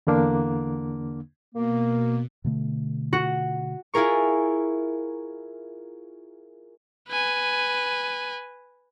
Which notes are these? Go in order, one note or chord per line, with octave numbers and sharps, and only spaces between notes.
E2 D3 A#3 D4
B2 A#3
B2 D3 A3
F#4
E4 F4 G#4 A#4 C#6
B4 G#5